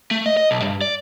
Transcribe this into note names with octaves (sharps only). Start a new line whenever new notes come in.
A3
D#5
D#5
B1
G2
D5